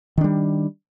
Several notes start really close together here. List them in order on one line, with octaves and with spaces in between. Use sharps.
D#3 D4 G3